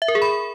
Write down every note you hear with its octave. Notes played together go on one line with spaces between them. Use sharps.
E5
A#4
G#4
B5